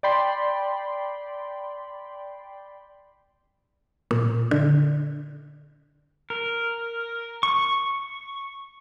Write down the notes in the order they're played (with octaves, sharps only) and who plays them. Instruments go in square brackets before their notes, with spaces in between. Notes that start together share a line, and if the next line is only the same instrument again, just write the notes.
[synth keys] D5 G5 B5 C6
[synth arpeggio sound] A#2
D3
[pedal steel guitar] A#4
C#6